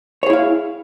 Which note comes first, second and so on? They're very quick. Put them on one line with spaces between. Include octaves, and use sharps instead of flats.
C#5 G#4 E4 F5